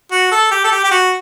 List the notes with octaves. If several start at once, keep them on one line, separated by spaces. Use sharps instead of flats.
F#4
A4
G4
A4
G4
G4
F#4